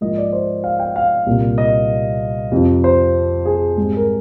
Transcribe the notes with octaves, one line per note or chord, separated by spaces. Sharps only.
G#2 F3 A#3 D#5
D5
C5
F5
G5
F5
C2 A#2 G3 A#3
D#5
F2 C3 F3
C5
G#4
G#2 G3 C4
A#4